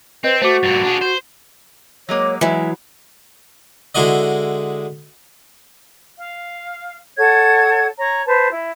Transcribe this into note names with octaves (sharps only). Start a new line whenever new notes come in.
C4 B4 C5 D#5 G6
A3 F#4 C5 D6
G2 A#2 A6
D4 G#4
C5
F#3 G#3 A#3 C#5
E3 F#3 G#3 E5 G#5
D3 G#3 E4 F#4 D#5
F5
A4 C#5 F#5 G#6
C#5 A#5
B4 C5 A5
E4